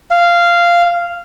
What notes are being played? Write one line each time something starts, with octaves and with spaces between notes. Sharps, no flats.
F5